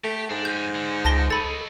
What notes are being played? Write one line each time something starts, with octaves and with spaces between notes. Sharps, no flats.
A3 G4
G#2 D4
F3 C#4 G6
D3
C#2 A5 A#6 G7
A4 C#5 D#5 B5 A6